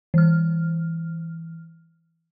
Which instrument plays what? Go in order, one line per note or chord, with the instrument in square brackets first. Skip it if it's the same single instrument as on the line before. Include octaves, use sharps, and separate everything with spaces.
[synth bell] E3 F6